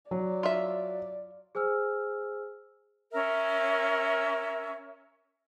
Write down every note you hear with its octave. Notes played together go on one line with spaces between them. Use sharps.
F#3 D5
F4 E5
G#4 C5 G#5 E6 F6
C#4 A#4 E5 E6